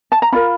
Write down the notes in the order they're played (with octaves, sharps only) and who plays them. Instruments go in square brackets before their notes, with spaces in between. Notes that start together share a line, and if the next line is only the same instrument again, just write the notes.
[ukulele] A5
A#5
C#4 F4 A#4 B5